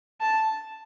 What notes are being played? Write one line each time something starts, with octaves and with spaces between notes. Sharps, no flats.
A5